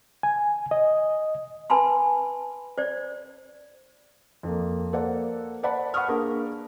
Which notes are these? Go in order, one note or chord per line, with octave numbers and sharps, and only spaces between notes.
G#5
D#5
B4 G#5 A5 B5 C6
C5 D5
F2 A#3
A#3 A4 A#4 C5 D5 F#5
C5 D5 F#5 A5 B5
F#5 B5 C#6 D#6 F6
A#3 D4 G#4 A#4